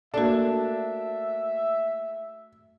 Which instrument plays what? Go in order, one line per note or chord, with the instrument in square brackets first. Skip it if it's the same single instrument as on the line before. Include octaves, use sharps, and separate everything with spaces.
[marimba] A3 F#4 [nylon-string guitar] A#3 A4 [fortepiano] D4 [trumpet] E5